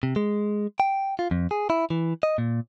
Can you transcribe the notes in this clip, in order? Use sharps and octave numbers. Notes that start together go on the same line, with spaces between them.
C3
G#3
G5
F4
F2
G#4
E4
E3
D#5
A#2